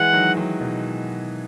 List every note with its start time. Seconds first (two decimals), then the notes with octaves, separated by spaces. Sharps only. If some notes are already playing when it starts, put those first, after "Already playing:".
Already playing: E3 G#3 F#5
0.13 D#3 F#3
0.37 D#3 F#3
0.60 B2 D#3